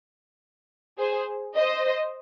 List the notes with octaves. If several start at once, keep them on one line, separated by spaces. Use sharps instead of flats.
G#4 C5
C5 D#5